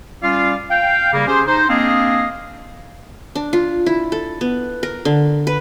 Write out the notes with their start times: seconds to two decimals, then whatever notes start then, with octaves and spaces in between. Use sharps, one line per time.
0.22 G3 C#4 F4 D5 F5
0.70 F5 G5
1.13 C#3 G3 A#3
1.27 C#4 G4 G#4 C5
1.47 D#4 C5
1.69 A#3 C4 D4 G#4 D#5 F5
3.35 D4
3.53 F4
3.86 E4
4.12 A4
4.41 B3
4.83 A#4
5.05 D3
5.47 B4